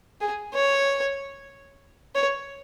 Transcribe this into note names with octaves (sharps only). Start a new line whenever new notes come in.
G#4
C#5
C#5